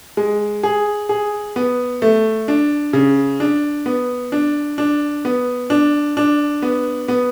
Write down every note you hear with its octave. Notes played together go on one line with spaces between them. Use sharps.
G#3
G#4
G#4
B3
A3
D4
C#3
D4
B3
D4
D4
B3
D4
D4
B3
B3